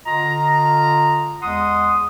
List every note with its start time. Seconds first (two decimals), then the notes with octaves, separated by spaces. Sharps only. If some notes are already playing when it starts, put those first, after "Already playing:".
0.06 D3 F4 D#5 A#5
1.42 E2 G#3 F#5 C6 D#6